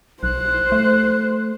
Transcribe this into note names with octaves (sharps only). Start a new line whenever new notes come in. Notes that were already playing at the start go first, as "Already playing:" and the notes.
B1 C5 F#6
A3